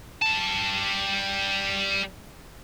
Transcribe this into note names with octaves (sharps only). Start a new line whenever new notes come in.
G3 A5